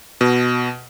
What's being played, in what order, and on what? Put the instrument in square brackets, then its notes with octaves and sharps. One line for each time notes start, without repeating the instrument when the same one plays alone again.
[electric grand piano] B2